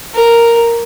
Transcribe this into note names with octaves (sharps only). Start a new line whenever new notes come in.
A#4